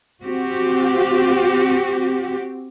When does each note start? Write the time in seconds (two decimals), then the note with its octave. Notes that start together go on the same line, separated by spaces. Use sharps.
0.24 C4 F#4 G4